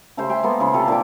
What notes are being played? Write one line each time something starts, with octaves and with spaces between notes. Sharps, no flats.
C#3 A3 G4 C5
E5 G5 G#5 C6
G#3 A#3 B3 A4
C#3 E4 C5
C3 F4 A4
A#2 D#3 D6